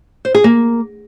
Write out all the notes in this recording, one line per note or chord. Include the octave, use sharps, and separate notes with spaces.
C5
G#4
A#3